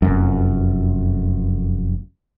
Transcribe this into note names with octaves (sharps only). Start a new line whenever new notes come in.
F1 F#2